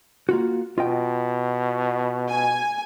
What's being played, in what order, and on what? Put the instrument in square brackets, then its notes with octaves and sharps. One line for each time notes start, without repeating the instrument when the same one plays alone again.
[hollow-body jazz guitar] A#3 F4 F#4
[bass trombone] B2 [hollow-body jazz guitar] F4 D#5 G5
[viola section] G#5